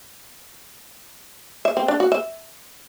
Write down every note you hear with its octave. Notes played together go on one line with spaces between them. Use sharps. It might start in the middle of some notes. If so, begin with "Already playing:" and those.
E5
C4
D4
F#4
E5